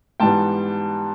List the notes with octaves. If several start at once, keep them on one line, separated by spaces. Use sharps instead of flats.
G#2 E3 G3 B3 G5 A5